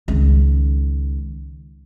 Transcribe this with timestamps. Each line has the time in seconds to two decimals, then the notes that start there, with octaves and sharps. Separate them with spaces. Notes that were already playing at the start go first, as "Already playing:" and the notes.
0.08 C#2 D#3